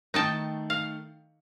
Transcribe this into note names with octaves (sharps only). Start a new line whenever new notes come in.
D#3 A3 D#4 G5 A5
F5